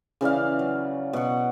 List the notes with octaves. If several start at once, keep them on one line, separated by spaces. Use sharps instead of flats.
C#3 E3 D5 F5
F#3
B2 F#5